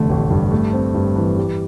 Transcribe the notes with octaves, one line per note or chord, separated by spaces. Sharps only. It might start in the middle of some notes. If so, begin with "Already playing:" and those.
Already playing: F1 E2 D3 A3
A1
G2
A3
C4
G2
E3
G3